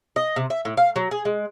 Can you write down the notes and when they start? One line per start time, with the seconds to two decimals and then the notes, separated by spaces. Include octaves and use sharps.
0.16 D#5
0.36 C3
0.50 E5
0.65 A2
0.77 F5
0.96 F#3
1.11 G#4
1.25 G#3